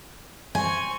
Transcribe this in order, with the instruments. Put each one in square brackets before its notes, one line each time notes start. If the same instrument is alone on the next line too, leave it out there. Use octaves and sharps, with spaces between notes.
[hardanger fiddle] C4 C#6 [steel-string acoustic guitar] G#5